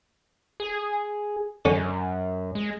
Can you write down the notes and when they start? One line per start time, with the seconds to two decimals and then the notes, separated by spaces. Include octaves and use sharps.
0.60 G#4
1.65 F#2 D3 C#4
2.55 G#3